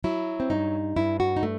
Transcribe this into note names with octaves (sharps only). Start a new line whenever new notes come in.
F#3 E4
C4
G2 D#4
G2 E4
F#4
D#4
A3